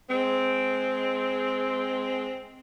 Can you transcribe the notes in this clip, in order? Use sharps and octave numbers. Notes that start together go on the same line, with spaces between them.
G#3 C4